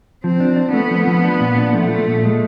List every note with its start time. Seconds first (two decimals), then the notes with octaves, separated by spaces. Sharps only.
0.24 F3 C4
0.40 D4
0.56 D4
0.74 A3 B3
0.91 F3
1.07 F3
1.24 D4
1.40 A#2
1.58 D4
1.74 F3 A3
1.91 F3
2.07 A#2
2.25 G#3